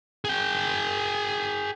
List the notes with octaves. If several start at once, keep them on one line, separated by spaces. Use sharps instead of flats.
G#4 G5